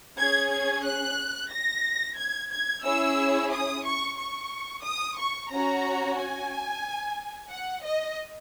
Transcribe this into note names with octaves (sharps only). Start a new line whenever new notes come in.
C#4 G#4 G#6
G#6
F#6
A#6
G#6
G#6
C#4 E4 G#4 E6
D#6
C#6
C#6
D#6
C#6
C#4 F#4 A#5
G#5
F#5
D#5